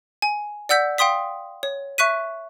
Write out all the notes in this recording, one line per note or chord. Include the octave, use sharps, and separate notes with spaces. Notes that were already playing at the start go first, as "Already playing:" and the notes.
G#5
D5 F#5 E6 G6 B6
F5 G5 C6 D#6 B6
C#5
E5 C#6 F#6 B6 D#7